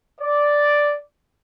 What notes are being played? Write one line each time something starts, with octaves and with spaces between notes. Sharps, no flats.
D5